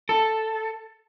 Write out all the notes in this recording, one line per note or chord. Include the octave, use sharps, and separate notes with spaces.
A4